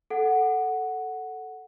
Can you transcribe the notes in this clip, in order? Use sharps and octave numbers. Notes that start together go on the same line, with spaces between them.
A4 F#5